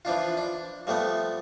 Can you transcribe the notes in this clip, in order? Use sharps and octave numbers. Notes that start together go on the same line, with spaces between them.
E3 F3 D4 F4
D4
F3 G3 A3 B3